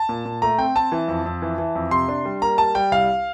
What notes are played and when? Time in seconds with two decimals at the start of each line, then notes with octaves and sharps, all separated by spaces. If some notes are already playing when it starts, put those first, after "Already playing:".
Already playing: A5
0.09 A#2
0.25 A#2
0.42 A3 A#5
0.58 C4 G5
0.75 C4 A5
0.92 E3
1.08 F2
1.26 F2
1.42 E3
1.58 E3
1.75 F2
1.91 C3 C6
2.08 D4
2.25 G3
2.42 A#3 A#5
2.58 G3 A5
2.75 G3 G5
2.92 C2 F5